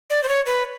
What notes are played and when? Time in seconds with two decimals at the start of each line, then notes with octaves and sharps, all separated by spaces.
0.10 D5
0.23 C5
0.28 C#5
0.46 B4